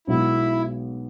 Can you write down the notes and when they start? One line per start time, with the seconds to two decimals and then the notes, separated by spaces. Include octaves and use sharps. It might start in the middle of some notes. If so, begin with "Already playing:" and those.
0.07 B1 B2 G#3 B3 E4 F#4